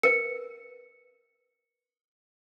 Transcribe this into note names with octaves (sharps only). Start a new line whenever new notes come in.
A#4 B4 C#7